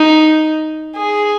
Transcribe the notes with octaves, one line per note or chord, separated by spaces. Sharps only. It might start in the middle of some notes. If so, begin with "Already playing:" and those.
Already playing: D#4
G#4